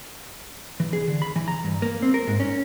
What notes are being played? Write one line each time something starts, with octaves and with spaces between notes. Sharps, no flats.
E3
G#4
D3
B5
E3
A#5
G2
A#3
C4
A#4
G#2
C#4